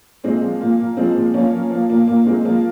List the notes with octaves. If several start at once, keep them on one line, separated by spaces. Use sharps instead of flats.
A#2 G#3 C4
F3
A#2 A#3
A#2
F3 G#3 C4
A#2
F3 A#3 C#4
F3
F3 A#3
A#2 A#3
A#2 A#3
A#2 G#3 C4
F3 A#3